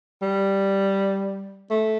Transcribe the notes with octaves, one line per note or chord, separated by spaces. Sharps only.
G3
A3